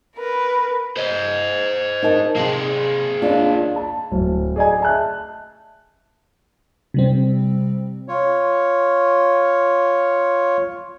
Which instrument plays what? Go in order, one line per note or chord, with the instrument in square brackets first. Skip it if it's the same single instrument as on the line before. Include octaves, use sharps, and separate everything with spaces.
[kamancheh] A#4 B4
[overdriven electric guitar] C5 D#5
[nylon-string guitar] D#4 A#4 A5
[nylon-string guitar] C3 [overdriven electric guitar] A#3 G#4
[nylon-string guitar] D#2 D4 F4
[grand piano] A5
D1
G#4 D5 D#5 G#5
E5 A5 F#6
[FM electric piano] C3 G3 C4
[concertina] F4 C#5